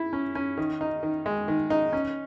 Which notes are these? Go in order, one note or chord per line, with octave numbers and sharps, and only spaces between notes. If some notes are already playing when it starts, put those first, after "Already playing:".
Already playing: E4
C#4
C#4
D#3
D#4
D#3
G#3
D#3
D#4
C#4